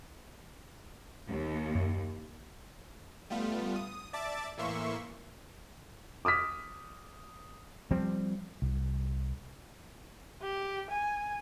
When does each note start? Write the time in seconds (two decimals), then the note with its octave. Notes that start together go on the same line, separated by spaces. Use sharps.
1.29 D#2
1.75 F#2
3.30 G3 A3 B3 F4
3.76 D#6
4.13 D5 E5 A5 D6 A6
4.58 A2 E3 A#3 E5 C6 C#6
6.25 D6 D#6 F6 B6
7.91 F3 G3 C4
8.62 C2
10.42 G4
10.91 G#5